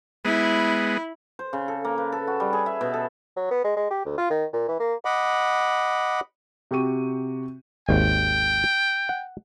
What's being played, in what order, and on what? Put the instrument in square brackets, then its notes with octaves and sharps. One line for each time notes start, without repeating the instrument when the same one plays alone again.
[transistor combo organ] G#3 B3 [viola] E4 B5
[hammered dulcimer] C5
C#3
A4
A#3
B4
A4
F#4
G3
G#4
E5
B2
A4
[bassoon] F#3
B3
G#3
G#3
G4
D2
F4
D#3
A#2
E3
A#3
[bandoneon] D#5 F#5 B5 D6
[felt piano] C3 F#4 G4 C#6 D#7
[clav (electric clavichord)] G#1 D#2 [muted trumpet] G5
[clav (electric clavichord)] F#5